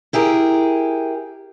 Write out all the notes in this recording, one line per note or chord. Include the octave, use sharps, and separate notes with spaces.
E4 G4 G#4 A#4